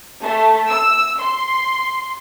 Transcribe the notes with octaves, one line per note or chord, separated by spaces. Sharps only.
A3
E6
C6